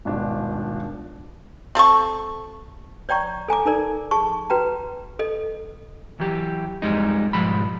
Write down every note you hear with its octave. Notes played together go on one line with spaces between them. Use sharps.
D#1 G#1 B2 D4
C4 A4 A5 C#6
C#5 D5 G5 A#5 C#6
A4 G#5 A#5 D6
D#4 A4 A#4 D5
G#4 A5 C#6
F#4 B4 G5 A#5
A4 D#5
E3 F#3 G4
F2 G3 G#3 D#4
B1 G#2 F3 G3 G#3 B5